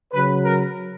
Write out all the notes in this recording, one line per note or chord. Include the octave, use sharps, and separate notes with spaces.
C#3 F#3 B4
A#4